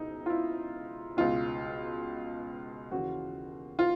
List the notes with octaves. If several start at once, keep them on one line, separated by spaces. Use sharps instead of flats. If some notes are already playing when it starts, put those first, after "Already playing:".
Already playing: C#2 B2 D#4 E4
F4
E4
C#2 B2 F4
D#2 C#3 E3 F#4
F4